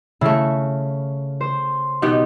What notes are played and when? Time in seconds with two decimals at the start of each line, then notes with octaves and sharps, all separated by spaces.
0.21 C#3 A3 E4
1.41 C5
2.02 B2 B3 D#4 G4